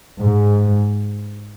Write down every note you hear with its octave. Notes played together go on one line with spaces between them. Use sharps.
G#2